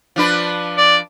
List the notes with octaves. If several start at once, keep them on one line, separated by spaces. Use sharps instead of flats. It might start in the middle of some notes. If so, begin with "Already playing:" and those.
F3 D4 B4
D5